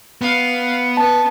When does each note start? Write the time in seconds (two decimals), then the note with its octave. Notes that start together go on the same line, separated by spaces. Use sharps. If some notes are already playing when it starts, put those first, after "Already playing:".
0.22 B3 F5
0.97 B3 A5